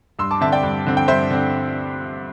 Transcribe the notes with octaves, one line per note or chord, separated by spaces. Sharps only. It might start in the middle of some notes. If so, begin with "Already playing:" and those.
G2 C6 E6
A5 D6
D3 C4 E5 A5
D5 G5
G2
D3 C4
G5
G2 C5 E5
D3 C4